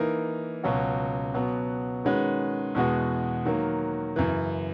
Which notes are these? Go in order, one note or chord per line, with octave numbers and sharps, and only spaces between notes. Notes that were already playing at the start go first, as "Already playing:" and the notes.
Already playing: E3 A#3 D#4 A#4
C#2 B2 F#3 C#4 F#4
B2 F#3 B3
D#3 G#3 C#4 F#4 B4
E2 B2 G#3 B3 F#4
D#3 F#3 A#3
F#2 C#3 E3